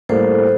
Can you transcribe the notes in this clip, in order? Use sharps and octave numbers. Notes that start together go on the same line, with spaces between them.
A2 G3 A#3 A4 C5